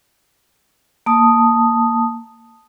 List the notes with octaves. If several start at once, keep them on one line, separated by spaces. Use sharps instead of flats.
A#3 A5 D#6